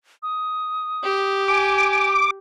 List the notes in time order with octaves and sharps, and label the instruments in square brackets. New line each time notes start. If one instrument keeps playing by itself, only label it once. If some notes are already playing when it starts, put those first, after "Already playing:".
[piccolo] D#6
[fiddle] G4
[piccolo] G#5 [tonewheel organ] D6